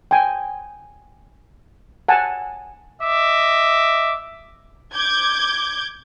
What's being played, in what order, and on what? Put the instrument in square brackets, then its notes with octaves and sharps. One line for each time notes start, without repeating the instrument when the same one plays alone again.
[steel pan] G5 G#5
F#5 G#5 A5
[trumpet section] D#5 E5 D6
[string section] D6 G6 G#6